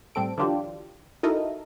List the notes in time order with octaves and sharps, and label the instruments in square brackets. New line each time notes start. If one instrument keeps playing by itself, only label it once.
[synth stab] A2 G3 C4 A4 D7
D3 E3 F#3 D4 F4 G4
D#4 E4 F#4 A4 A#4 D#5